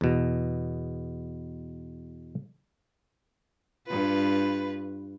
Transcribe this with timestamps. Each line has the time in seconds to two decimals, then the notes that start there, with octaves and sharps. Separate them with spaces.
0.01 E2 B2
3.87 G2 F4 B4